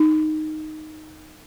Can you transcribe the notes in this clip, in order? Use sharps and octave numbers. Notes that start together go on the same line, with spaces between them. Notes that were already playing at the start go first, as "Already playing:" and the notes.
Already playing: D#4